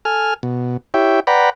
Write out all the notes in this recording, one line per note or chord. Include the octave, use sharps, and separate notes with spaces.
A4 G#5 F6
B2
E4 G4 C#5 E5 G5
B4 D5 F#5 G5 A#5 B5